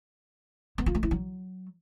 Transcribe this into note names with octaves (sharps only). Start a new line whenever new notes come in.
B3
F4
A3
E4
F#3